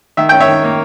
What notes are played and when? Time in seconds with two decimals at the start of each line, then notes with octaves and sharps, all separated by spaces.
0.17 D#3 E5
0.29 C#4 G5
0.40 C#5 E5
0.48 D#3
0.64 A#3